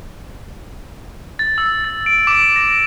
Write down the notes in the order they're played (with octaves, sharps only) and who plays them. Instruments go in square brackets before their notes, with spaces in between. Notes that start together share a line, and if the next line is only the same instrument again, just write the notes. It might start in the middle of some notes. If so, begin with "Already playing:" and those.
[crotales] A6
E6
A6
D7
D6
A#6